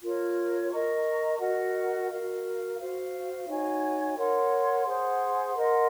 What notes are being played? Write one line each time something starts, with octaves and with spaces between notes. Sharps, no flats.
F4 A#4 C#5
A#4 D#5 A#5 C#6
F#4 A#4 D#5 F#5
F#4 A#4 F5
F#4 C5 F5
D#4 F#4 C#5 G#5
A#4 C#5 F#5 C6
G#4 C5 F#5 C6
A#4 D#5 F#5 C6